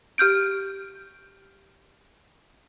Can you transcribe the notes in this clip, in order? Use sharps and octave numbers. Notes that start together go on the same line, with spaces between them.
G4 F6 G6 D7